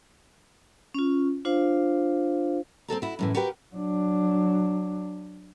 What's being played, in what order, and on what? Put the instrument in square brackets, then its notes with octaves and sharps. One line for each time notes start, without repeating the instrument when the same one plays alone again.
[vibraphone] C#4 F4
D4 F4 C5 F5
[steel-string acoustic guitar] C4 F#4 A4 A#5
E4 F#4
F#2 A2 E3
F#4 G4 A#4 B4 G5
[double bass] F#3 D4